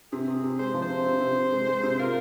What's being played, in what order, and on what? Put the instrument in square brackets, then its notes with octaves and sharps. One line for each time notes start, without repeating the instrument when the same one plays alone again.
[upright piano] C3 [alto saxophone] G#4
[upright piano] C3
C3
[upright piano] G#3 [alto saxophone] C5
[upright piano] F3
[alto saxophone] C5
[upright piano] C3
C3
C3
C3
G#3
G#3
C3
[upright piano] F4 [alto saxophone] A#4